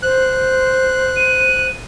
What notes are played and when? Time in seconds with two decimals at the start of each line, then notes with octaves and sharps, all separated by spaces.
0.03 C5 F#6
1.16 D#7